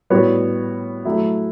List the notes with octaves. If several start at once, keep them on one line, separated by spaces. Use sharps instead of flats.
A2 G3 B3 F#4 C#5
F#3 A3 E4